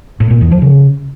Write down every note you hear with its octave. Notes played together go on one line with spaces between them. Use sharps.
A2
A#2
E2
F3
C#3